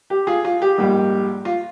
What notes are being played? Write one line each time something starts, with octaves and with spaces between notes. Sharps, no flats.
G4
F4 G#4
F4
G4
A#1 G#2 G3
F4